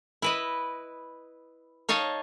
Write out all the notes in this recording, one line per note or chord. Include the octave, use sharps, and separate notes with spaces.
E4 B4 D#5
D#4 C#5 D#5 F5 A5